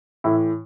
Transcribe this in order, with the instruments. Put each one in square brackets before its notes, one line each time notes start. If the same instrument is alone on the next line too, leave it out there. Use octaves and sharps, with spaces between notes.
[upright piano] A2 E3 E4